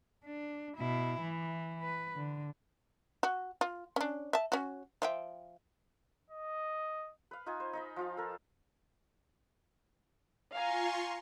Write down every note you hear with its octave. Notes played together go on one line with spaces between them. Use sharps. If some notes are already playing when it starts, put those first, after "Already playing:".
D4
B2 E4
E3
B4
D3
F#4
F4
C#4 D4
E5 A5
C#4 F#4
F3 E5 G5
D#5
B4 F5
D#4 F4 D#5 G#5
C5
D#4 D#5 B5
F3 F4 F5
A4 A#4
F4 F5 G#5 A#5 C6 C#6